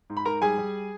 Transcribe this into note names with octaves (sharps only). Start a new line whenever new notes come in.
G#2
B5
G#2 A#4 A#5
G3 G#4 G#5
G3